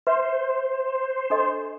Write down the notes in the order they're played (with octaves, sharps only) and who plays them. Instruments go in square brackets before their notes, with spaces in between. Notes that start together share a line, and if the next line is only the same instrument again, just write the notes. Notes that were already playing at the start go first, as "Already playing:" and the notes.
[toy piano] B4 E5 [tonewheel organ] C5
[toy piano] D4 A4 D#5